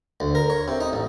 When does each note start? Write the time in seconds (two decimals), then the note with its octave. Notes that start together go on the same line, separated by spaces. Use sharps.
0.20 D2
0.35 A#4
0.50 C#5
0.68 C3
0.80 D#4
0.93 A1